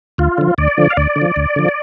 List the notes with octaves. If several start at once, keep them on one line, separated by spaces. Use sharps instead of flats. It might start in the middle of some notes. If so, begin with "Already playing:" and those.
D2 F4
D3 F3
D2 D5
D3 F3
F5
D2 D5
D3
F3
D2
D3 F3